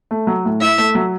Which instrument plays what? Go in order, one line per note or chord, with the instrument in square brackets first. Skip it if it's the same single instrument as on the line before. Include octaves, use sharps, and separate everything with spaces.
[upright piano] A3
F#3
A2
[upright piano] E4 [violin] E5
[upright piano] A3
F#3